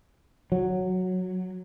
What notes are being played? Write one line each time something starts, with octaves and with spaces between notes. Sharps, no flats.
F#3